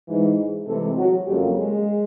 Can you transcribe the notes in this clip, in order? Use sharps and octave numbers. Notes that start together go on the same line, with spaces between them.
G#2 E3 G#3
C3 E3 G#3 A3 A4
F#3 F#4
F2 C#3 F#3 G3 A#3 G4
G#3 G#4